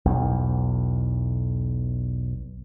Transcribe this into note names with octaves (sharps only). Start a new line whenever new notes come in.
B1 E2